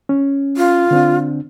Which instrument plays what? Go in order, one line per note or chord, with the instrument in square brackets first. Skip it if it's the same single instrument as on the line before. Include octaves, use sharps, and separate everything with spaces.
[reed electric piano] C#4
[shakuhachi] F4
[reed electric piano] D3 C4 D4